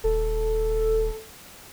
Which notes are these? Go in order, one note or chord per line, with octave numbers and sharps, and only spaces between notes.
D#1 A4